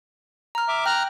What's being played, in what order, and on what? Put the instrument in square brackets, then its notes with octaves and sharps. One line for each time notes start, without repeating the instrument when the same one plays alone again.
[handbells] A#5 F6
[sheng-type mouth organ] E5 D6
[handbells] G5 [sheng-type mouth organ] A#5 F6 F#6